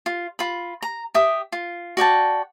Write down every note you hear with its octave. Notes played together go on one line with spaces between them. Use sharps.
F4
F4 B5
A#5
G4 E5 D#6
F4
F#4 D5 G5 A5